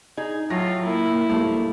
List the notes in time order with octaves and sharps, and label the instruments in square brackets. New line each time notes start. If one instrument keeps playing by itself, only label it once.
[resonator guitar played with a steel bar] D#4 G#4
[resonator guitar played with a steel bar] A2 [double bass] F#3 [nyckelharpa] F4 [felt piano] A#6
[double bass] A#3 [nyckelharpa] E4
[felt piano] B1 G2 A3 [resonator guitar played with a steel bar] F3